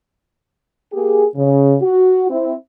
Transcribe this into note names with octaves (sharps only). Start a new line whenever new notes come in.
A#3 G4 G#4
C#3
F#4
C4 E4